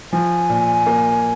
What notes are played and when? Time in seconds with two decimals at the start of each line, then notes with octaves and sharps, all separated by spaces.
0.12 F3 G#5
0.49 A#2
0.86 A#3